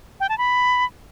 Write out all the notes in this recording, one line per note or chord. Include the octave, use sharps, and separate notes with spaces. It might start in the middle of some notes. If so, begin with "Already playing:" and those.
G5
A5
B5